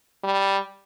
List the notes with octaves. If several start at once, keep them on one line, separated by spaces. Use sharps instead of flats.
G3